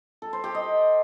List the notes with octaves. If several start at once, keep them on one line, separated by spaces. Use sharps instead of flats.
A4
C5
G4
D#5